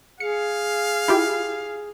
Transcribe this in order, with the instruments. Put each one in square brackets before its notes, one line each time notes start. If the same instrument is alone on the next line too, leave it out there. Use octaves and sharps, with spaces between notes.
[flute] G#4 [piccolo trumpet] F5 [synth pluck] C#7
[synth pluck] E4 F4 G4